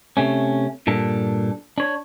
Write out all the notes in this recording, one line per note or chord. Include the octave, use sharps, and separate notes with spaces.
C3 A3 C#4
G2 A#2 D4 A4
D4 C#5